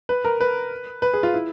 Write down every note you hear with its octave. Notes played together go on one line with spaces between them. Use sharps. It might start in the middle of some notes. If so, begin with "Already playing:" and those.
B4
A#4
B4
B4
G#4
F4
E4